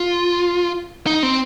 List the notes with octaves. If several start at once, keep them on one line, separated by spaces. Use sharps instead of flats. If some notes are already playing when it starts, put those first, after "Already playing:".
Already playing: F4
D#4
C4